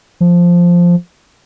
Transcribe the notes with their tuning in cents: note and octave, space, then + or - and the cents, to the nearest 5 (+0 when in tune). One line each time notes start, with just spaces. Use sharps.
F3 +0